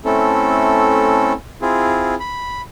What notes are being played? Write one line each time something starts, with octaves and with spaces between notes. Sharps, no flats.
A3 C4 C#4 E4 A4
C4 E4 F4 G#4
B5